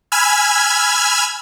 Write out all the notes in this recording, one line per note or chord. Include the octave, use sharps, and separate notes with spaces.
G#5 B5 E6 F6 G#6